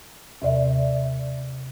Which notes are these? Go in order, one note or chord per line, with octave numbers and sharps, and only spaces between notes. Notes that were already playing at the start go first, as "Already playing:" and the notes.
D#2 C3 D5 E5